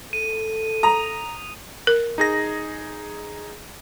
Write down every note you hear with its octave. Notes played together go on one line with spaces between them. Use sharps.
A4 D#7
A#5 D#6
A#4
D#4 G#4 A#6